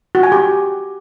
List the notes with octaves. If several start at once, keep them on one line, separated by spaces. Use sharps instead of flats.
F#4
G#5
G4